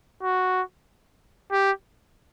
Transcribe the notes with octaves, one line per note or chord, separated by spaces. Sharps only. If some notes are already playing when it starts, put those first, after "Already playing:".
F#4
G4